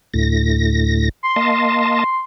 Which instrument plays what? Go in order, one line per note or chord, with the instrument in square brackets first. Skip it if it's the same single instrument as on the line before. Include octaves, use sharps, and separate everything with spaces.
[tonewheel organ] D2 A2 A#6
[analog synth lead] C6
[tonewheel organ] A#3 D#5 A5